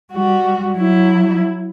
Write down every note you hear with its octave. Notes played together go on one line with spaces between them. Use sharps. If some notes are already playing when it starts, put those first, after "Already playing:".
G3 F#4
F#3 E4